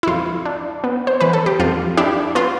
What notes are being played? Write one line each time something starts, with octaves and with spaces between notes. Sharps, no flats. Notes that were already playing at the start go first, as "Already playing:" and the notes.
E4
F2 F4
D4
B3
C5
E3 B4
A4
G4
F2 F4
D4 E4 G4
B3 F4